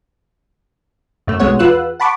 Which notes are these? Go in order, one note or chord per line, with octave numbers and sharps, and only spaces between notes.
F#2 A3
B1 G#3 A3 B3 C#5 F#5
E2 F4 B4 F#5 E6 F#6
F#5 A5 B5 C#6 D6